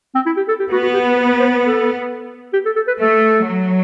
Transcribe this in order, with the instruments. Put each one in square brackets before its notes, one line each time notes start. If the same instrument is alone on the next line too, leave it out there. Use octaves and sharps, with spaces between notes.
[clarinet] C4
E4
G4
A4
G4
[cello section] B3 [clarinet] F#4
[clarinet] F#4
G4
B4
B4
C5
B4
A4
G4
A4
A4
B4
[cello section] A3 [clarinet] A4
[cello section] F#3